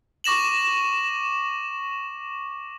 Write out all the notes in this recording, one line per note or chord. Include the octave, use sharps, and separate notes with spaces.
C#6 D6 A#6 E7 F#7